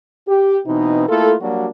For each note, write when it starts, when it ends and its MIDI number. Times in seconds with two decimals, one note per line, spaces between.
0.27 0.59 67
0.67 1.04 47
0.67 1.04 52
0.67 1.04 60
0.67 1.04 63
1.08 1.35 57
1.08 1.35 58
1.08 1.35 64
1.08 1.35 65
1.08 1.35 69
1.41 1.67 54
1.41 1.67 55
1.41 1.67 58
1.41 1.67 62
1.41 1.67 66